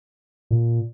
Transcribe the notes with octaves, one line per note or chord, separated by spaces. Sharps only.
A#2